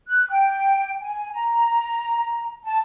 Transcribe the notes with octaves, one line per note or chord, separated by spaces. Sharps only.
F#6
G5
G#5
A#5
A5